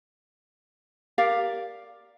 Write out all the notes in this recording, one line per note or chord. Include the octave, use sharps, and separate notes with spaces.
G4 A#4 D5 F5